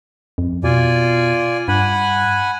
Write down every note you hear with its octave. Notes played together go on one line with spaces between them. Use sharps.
F2
B2 F4 D5 G#5
G2 F#5 G#5 B5